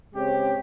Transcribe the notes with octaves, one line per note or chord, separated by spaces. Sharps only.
C#3 G#3 C4 G4 C#5